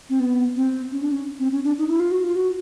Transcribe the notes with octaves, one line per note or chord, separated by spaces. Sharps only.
C4
B3
C4
C#4
D4
C#4
C4
C#4
D4
D#4
E4
F4
F#4
F4
F#4